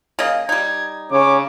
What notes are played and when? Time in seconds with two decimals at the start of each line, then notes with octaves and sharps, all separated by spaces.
0.19 C#3 A#3 D#5
0.49 G3 D#4 G#6
1.12 C#3 C#4 C#5 D6